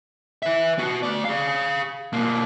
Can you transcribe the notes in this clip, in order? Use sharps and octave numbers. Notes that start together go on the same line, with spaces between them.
B4 E5
B3 F#4
A3 D5
G#4 F5
B2 A#3